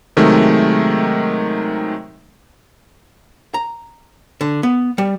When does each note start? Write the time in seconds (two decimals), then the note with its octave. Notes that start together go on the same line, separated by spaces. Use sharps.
0.17 C3 D#3 F#3 G#3 A3
3.54 A#5
4.41 D3
4.63 B3
4.98 G3